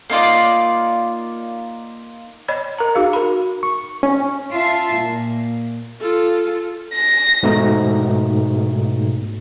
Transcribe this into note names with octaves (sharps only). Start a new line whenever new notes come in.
A#3 D#4 F4 D5
C#5 D#5 B5
A#4 A#5
D#4 F#4 G#4 F5
A#4 B5
C#6
C#4
F4 E5 A5 C7
A#2
F4 A4
A#6
G#2 B2 A3 D#4